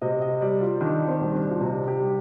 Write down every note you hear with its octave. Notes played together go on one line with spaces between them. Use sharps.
C3 D#5
D#5
G3 D5
F4
D#3 D4
C4
C2
D4
F4
C3 D#4
G4
G3